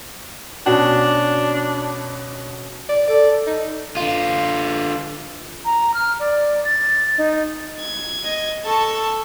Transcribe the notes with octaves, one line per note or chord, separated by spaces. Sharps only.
B2 C#4 D4 F#4
D5
A4 D5
D#4
D3 F4
A#5
F6
D5
A6
D#4
G#6
D#5
A4 A5 C#6